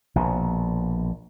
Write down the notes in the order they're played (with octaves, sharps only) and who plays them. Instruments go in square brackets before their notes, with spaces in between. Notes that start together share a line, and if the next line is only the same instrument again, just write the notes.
[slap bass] A#1 B2